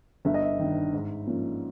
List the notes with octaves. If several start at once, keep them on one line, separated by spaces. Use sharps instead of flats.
G1 E5
D#5
E5
G2 D#3
G#2
F3 A#3 C#4